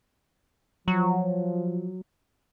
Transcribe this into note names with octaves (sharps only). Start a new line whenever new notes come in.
F3 F#3